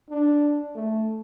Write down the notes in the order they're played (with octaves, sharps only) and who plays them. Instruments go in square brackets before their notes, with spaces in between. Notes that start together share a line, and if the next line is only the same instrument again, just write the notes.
[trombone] D4
A3